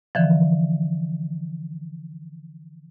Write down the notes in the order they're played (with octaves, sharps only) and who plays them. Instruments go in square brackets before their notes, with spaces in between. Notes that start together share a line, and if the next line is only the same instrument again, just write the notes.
[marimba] D3 E3 F3